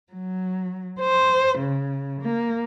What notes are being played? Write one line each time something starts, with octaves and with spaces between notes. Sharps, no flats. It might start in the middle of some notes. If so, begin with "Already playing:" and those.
F#3
C5
C#3
A#3